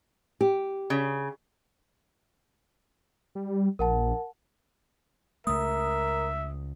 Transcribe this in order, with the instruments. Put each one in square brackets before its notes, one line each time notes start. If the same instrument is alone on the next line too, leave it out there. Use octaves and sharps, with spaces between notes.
[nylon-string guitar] G4
[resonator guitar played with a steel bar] C#3
[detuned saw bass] G3
[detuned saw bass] A#1 [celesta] A#4 F#5 A5
[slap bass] C#2 A3 [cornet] A#4 [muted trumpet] E5 [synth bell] D#6